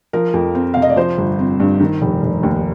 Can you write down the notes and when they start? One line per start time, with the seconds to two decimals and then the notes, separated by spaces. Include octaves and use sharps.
0.13 F3 A#4
0.34 F2
0.55 C4
0.74 C3 F5
0.82 D#5
0.89 D5
0.96 F3 C5
1.18 G1
1.39 C4
1.60 G2
1.80 D#3
2.02 F1
2.22 F1
2.43 D#2